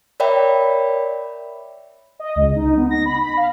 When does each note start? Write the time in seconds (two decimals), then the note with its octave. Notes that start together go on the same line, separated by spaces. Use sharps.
0.20 A#4 C#5 D5 E5 G5 B5
2.19 D#5
2.36 C#2
2.56 D#4
2.77 B3
2.91 A#6
3.06 B5
3.20 B5
3.37 F5